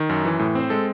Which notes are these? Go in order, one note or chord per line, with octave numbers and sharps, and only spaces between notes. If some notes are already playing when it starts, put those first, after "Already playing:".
Already playing: D#3
F#2
E3
A2
C4 C5
G#3 A4